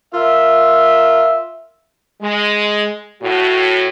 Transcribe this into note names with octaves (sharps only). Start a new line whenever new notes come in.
F4 A#4 E5
G#3
A2 F#4